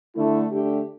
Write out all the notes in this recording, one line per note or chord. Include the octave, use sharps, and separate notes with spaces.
D3 A3 E4
D3 A3 D4 G4